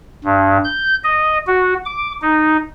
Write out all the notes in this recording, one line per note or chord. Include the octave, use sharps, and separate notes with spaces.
G2
G6
D#5
F#4
D6
D#4